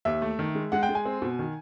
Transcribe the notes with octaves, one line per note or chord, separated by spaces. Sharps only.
D#2 E5
A3
D#3
G#3
G#3 F#5
G5
G#3
G#5
C4
B2
D#3